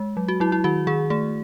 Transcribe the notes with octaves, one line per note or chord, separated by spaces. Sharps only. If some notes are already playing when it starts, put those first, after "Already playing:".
Already playing: G#3
F#3
F#4
F#3 E4
E4
D#3 F#4
D#3 G#4
A3 G#4